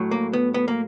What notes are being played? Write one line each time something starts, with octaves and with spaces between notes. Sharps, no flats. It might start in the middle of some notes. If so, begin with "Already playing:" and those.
Already playing: A2 F#3
A#3
B3
B3
A#3